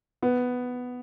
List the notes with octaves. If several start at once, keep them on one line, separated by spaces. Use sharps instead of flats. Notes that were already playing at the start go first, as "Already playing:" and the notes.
B3